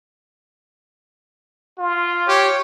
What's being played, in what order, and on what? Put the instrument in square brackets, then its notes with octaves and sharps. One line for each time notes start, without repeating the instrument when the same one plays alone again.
[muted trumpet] F4
[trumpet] G4 [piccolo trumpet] C#5